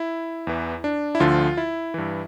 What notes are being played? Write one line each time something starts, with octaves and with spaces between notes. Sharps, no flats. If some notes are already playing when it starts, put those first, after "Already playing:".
Already playing: E4
E2 E3
D4
E4
D2 D3 F3 F4
E4
G2 E3